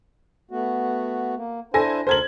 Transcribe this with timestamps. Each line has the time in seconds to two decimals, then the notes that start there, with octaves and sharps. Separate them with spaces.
0.51 A3 B3 F#4
1.36 A#3
1.74 D4 E4 A4 C5 G#5 A#6
2.07 D2 A4 A#4 C5 G#6 F#7